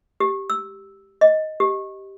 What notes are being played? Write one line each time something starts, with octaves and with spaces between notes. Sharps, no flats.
G4
E6
D#5
G4